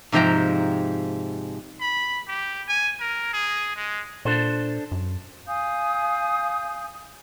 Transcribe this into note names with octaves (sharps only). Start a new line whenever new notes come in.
G#2 C3 F3 G5 A#5
B5
G4
G#5
A#4
G#4
G#3
A#2 D4 A4 C5
F#2
F5 G#5 D#6 G6